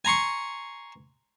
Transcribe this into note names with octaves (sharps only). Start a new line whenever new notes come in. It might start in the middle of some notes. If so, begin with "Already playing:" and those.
G#5 A#5 C6 C#6